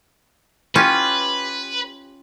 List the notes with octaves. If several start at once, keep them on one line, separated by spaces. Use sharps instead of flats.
C#4 F4 G4 B4